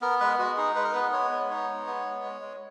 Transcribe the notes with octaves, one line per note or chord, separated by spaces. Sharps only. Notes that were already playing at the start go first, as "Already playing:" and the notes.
B3 A#4
G#3 B4
G#3 F#4
D#4 G#4
G#3 B4
A#4
B3 B4
G#3 C#5
B3
D#4 C#5
G#3
B3
G#3
G#3
G#3